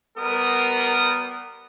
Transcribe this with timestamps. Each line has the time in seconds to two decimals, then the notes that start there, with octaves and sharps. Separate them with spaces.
0.17 G3 B3 A#4 D#6